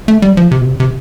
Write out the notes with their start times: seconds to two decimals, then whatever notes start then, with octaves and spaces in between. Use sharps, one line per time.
0.08 A3
0.22 G3
0.37 F3
0.51 C3
0.61 B2
0.65 C3
0.80 C3